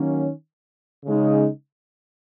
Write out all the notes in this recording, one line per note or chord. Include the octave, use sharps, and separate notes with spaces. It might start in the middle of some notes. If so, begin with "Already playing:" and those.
Already playing: D#3 F#3 A#3 C#4
C#3 G#3 D#4